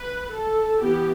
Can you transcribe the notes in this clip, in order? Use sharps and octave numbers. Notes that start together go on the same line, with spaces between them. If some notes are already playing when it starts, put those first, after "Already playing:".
Already playing: B4
A4
E3 B3 G4